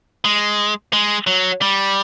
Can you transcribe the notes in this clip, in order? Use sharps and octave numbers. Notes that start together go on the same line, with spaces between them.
G#3
G#3
F#3
G3